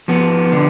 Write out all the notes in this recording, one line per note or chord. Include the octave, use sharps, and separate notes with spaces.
F3 B3
D3